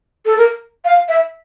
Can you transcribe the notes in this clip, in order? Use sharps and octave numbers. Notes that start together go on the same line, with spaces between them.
A4
A#4
F5
E5